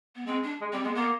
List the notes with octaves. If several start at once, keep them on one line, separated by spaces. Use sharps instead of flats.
B3
G#3 C4
D4
G#3
G3 C4
G#3 B3
A#3 B3